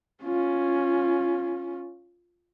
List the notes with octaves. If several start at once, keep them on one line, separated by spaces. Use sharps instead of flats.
C#4 F4